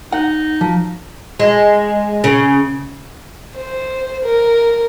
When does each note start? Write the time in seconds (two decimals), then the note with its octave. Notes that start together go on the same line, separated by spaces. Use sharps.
0.12 D#4 F#5
0.61 F3
1.40 G#3
2.24 C#3
3.56 C5
4.25 A#4